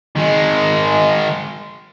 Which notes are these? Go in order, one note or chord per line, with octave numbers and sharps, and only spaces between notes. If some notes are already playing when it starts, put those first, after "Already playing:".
D#3 G#3